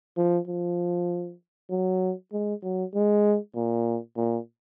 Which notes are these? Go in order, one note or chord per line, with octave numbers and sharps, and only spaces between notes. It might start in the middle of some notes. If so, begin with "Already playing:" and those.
F3
F3
F#3
G#3
F#3
G#3
A#2
A#2